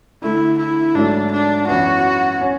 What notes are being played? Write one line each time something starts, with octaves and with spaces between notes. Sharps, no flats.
D3 A3 D4 E4
E4
G#2 F#3 A3 D4
D4
F#2 E3 B3 F#4
C#4